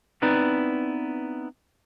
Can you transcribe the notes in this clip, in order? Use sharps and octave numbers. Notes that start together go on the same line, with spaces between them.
B3 C4 D#4 E4 B4 D5